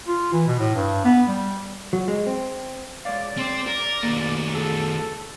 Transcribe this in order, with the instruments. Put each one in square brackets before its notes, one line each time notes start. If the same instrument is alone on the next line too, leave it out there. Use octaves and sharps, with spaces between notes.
[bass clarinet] F4
E3
B2
A2
G2
B3
G3
[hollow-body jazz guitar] F#3
G#3
C4
[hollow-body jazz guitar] G#3 C#5 F5 [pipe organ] D5
[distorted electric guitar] C4 C5
A#4
[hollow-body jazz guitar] B2 A#3 [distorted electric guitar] D#3 A3
[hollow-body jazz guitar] C2 G#4 [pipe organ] A4